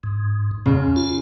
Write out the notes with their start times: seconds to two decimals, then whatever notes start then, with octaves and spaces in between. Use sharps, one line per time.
0.03 G#2
0.66 F2 C#3
0.96 F4